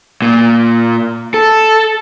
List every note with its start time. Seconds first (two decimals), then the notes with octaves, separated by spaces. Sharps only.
0.22 A#2
1.34 A4